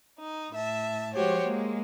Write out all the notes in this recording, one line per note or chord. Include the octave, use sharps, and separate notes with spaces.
D#4
A2 E5 A5
F3 G#3 F#4 G4 C5 C#5
G#3 A#3